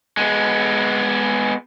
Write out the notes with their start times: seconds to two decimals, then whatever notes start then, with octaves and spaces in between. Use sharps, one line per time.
0.17 G#3 B3